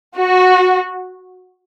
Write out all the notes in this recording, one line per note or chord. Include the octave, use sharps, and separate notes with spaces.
F#4